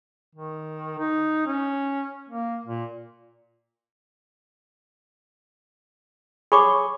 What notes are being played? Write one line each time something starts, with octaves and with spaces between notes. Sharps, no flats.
D#3
D#4
C#4
A#3
A#2
G#4 C#5 B5 C#6 D6